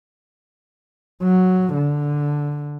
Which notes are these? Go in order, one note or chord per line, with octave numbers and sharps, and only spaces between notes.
F#3
D3